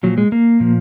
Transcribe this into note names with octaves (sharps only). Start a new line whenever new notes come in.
A#2 F3 F#3
G#3
A#3
A#2 F3